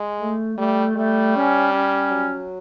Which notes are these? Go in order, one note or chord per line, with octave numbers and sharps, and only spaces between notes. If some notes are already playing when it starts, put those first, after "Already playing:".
Already playing: G#3
A3
G3 A3
G3 A3
C#4
C#4
F#3